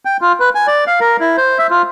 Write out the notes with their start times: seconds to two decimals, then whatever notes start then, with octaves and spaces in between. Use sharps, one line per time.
0.05 G5
0.21 F4
0.40 B4
0.55 G#5
0.67 D5
0.87 F5
1.00 A#4
1.20 E4
1.37 C5
1.59 E5
1.70 F4